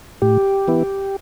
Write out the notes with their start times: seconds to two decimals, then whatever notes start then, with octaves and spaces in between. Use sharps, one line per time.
0.22 A2 G4
0.68 E3 B3 E4